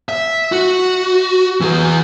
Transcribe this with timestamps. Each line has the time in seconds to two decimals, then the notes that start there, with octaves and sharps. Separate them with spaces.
0.09 E5
0.52 F#4
1.61 E3 G#4